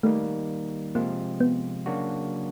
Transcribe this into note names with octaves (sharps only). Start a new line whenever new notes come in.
D#3 G3 A3 A#3 D#4
C3 F3 G#3 A#3 C4 F4
B3
C#3 F#3 A#3 D4 F#4